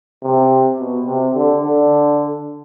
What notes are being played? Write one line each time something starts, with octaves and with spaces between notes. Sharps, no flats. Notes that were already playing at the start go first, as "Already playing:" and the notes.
C3
B2
C3
D3
D3